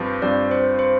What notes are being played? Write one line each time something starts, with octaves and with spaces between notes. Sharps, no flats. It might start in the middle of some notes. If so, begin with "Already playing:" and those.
Already playing: G2 F3 C4 G4 B4
G2 F3 C4 G4 D5
C5
C5